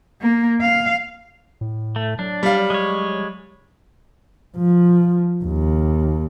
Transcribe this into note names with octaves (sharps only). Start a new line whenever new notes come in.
A#3
F5
A2
A3
F#3 D4
G3 F5
G#3 C#5
F3
D#2